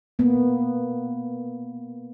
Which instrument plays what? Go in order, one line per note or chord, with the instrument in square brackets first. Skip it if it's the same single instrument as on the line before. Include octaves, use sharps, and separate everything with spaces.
[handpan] A#3 B3